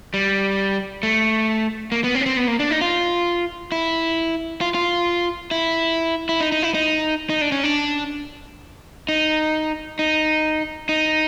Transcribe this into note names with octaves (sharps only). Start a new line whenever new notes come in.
G3
A3
A#3
B3
C4
C#4
C4
B3
A#3
D4
D#4
F4
E4
F4
F4
E4
E4
D#4
D#4
E4
D#4
D#4
D4
C#4
D4
D#4
D#4
D#4